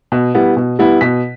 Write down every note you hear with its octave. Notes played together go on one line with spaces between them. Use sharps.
B2
G3 B3 E4
B2
G3 B3 E4
B2 B6